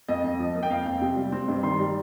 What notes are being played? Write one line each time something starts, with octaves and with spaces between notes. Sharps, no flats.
F2 D#5
F2
F3
A#3
G5
F2 F5
F2 G5
C3
G3
C4
G2
D#3 C6
G3